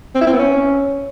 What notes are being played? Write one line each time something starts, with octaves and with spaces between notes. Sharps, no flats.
C4
E4
C4
B3
C#4